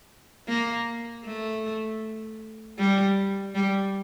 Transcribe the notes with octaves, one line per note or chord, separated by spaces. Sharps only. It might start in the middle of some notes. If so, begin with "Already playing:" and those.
A#3
A3
G3
G3